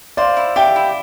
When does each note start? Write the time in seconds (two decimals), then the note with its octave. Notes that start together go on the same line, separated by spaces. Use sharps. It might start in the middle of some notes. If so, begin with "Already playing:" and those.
0.17 C5 D5 F5
0.37 E4
0.56 G4 E5 G5
0.76 E4